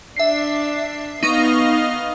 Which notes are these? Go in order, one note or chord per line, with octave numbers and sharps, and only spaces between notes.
D4 E5 C7
B3 D#4 D#5 F5 C#6 A#6